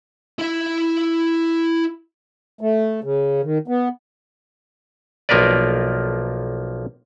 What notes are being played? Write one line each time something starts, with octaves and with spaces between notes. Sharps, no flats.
E4 E5
A3
C#3
D#3
B3
B1 F3 A#3 A#4 B4 D5